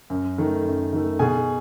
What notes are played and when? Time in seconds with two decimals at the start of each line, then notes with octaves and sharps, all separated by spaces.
0.10 F#2
0.38 D#3 A3
0.65 F#2
0.93 D#3 A3
1.19 B2 G#4 G#5